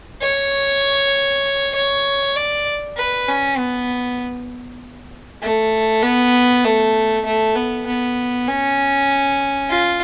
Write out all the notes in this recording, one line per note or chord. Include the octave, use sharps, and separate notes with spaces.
C#5
C#5
D5
B4
C#4
B3
A3
B3
A3
A3
B3
B3
C#4
F4